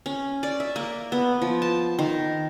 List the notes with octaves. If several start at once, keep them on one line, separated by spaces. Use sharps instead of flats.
C#4
D5
E5
A#3
B3
F3
A5
D#3